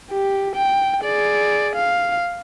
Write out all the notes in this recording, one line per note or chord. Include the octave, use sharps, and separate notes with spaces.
G4
G5
G#4 D5
F5